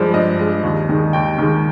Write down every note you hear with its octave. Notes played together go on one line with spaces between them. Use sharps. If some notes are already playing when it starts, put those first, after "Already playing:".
Already playing: G2 F3 G#3 D5
G2 D#5
F3 G#3
D#2
D#3 G#3
D#2 G5
D#3 G#3